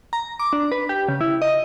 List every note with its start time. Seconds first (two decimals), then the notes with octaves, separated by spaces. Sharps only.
0.13 A#5
0.40 D6
0.53 D4
0.72 B4
0.89 G4
1.09 C#3
1.21 E4
1.42 D#5